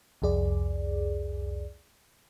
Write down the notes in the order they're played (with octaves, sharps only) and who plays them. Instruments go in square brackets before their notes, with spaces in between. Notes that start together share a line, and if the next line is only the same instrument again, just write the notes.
[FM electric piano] C2 F2 G#4 D5